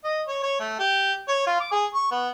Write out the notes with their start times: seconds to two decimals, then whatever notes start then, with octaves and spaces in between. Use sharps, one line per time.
0.04 D#5
0.27 C#5
0.43 C#5
0.60 A3
0.79 G4
1.28 C#5
1.47 F4
1.60 D6
1.72 G#4
1.94 C#6
2.11 B3